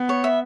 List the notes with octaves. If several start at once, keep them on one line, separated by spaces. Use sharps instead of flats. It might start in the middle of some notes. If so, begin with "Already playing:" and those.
Already playing: B3
C#5
E5